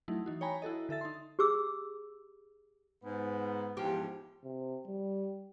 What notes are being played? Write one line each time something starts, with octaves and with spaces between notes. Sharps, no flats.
F#3 A3 D#4 E4
E3 D#4 F#4
C#5 G5 G#5 A#5 B5
E4 F#4 A4 D#5
D3 A4 E5 A6
D#4 C6
G4 G#4 D6 E6
G#2 B3
E2 G#2 F3 G4
C3
G3